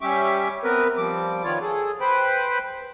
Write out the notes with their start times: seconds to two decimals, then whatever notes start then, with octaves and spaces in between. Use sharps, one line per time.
0.01 G3 C#4 G4 E5 C#6 D6
0.64 B3 C4 A#4 B4
0.97 F3 G3 D6
1.44 D#3 B3 F4 C#5 D5
1.62 G#4 A4
2.00 B4 C5 G5 B5